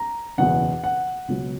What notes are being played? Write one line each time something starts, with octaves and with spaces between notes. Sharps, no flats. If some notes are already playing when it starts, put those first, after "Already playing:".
Already playing: A#5
F#1 E2 B2 F#5
F#5
C#2 B2 F#3